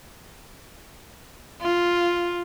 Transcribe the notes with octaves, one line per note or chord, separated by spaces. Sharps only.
F4